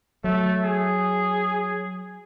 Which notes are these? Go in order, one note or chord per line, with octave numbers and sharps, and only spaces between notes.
F#3 A3
G#4